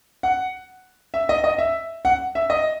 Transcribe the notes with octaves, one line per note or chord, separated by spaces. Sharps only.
F#5
E5
D#5
D#5
E5
F#5
E5
D#5